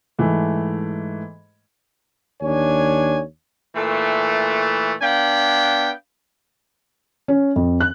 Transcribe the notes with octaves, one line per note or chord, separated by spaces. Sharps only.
G#2 E3 A3
D#2 D4 C#5 G#5
A#2 E3 A3
B3 D4 F5 G5
C#4
F2
F#6